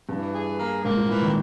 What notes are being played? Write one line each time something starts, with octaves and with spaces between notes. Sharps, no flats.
G2 E3
G#4
A#3
G#2 A#3
A#2
G#2 E3
D#3